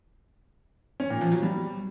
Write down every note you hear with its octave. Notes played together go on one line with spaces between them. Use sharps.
C#4
A#2
F3
F#3
G3